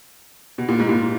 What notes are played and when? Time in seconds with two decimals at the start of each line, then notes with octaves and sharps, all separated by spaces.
0.58 B2
0.69 A#2
0.80 G#2
0.89 A#2